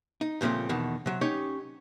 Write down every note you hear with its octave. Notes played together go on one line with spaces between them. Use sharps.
D#4
C#2 A#2 F3 A3 C4
E2 B2 D#3
C3 F#3
C#4 D#4 G4 C#5